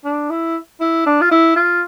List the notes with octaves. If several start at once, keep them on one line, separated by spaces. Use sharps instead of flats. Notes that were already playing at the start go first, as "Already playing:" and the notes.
D4
E4
E4
D4
F4
E4
F4